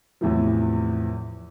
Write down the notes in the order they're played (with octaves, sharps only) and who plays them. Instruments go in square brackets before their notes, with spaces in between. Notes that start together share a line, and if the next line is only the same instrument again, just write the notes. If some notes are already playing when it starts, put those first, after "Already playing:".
[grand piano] E2 A2 C3 E3 F3